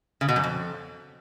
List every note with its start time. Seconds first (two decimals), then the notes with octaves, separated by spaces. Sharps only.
0.21 C#3
0.29 B2
0.36 F#2
0.44 F2